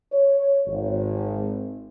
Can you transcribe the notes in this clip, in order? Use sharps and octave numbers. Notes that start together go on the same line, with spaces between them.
C#5
G#1